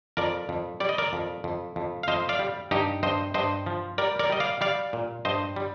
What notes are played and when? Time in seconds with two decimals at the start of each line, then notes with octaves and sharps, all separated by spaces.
0.17 F2 A#4 D5
0.49 F2
0.80 G3 D5
0.89 D#5
0.98 A#4 D5
1.13 F2
1.44 F2
1.76 F2
2.03 F5
2.08 F2 C5 D#5
2.29 D5 F5
2.39 G3
2.71 G2 D#4 G4
3.03 G2 C5 D#5
3.34 G2 C5 D#5
3.66 F3
3.98 G3 A#4 D5
4.19 A#4 D5
4.30 G3 D#5
4.40 D5 F5
4.61 G3 D5 F5
4.93 A#2
5.25 G2 C5 D#5
5.56 G3